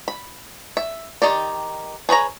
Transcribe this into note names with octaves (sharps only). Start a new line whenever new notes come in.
B5
E5
D#3 D#4 G4 D5
G#4 B4 C#5 A#5